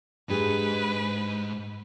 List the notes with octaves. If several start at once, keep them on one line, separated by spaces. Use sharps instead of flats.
G#2 D4 G4 G#4 B4